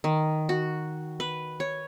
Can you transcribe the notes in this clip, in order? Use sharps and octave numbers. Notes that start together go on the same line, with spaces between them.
D#3
F#4
B4
C#5